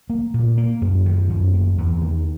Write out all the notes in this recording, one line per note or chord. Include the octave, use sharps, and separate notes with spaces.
A#3
A#2
A#3
F#2
D#3
F#2
A#3
E2
D#3